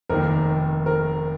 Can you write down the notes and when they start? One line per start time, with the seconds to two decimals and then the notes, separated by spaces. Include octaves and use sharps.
0.10 F1 D#2 D#3 A#4
0.86 A#4